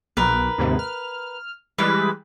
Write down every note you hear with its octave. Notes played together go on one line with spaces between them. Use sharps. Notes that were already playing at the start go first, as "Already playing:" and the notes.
B1 A#4 B4
D#2 G#2 C3
F6
E3 G3 G#3 B4